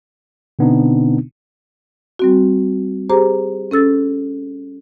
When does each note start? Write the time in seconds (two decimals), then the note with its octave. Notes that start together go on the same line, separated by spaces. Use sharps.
0.59 B2 D3 B3 C4 D4 D#4
2.19 G3 C4 F#4
3.10 G4 G#4 C5 A#5 D6
3.71 C#4 A4 E6 A6